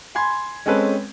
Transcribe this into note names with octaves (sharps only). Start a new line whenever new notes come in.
G#5 B5 C6 G#6
G#3 C4 C#4 A4 B4